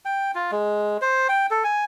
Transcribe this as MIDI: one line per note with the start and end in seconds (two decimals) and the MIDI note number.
0.05 0.31 79
0.35 0.51 65
0.52 0.98 56
1.02 1.28 72
1.29 1.46 79
1.51 1.64 69
1.64 1.85 80